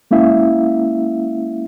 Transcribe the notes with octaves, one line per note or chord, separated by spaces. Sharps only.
G#3 A#3 C#4 E4 E5 F5